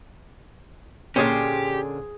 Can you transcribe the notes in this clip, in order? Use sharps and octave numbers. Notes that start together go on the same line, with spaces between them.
A#2 D3 C#4 G4 G#4 C5